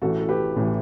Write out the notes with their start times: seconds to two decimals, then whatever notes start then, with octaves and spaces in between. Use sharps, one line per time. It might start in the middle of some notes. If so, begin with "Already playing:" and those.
0.02 A1 A2 E3 F#4 A4
0.20 A4
0.29 G4 B4
0.56 A1 A2 E3